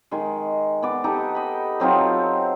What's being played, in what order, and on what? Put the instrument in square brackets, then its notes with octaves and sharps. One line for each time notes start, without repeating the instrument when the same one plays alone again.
[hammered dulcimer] D#3 G#3
B3 D5
D#4 G4 A4
D#5 B5
F#3 C4 D#4 F4